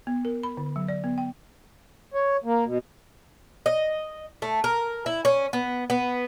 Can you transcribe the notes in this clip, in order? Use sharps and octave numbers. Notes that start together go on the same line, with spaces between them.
B3
A#4
B5
D3
F#3
D5
B3
G5
C#5
A#3
B2
D#5
A3
A#4
E4
C#4
B3
B3